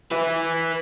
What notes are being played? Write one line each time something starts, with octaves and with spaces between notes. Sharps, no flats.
B4 E5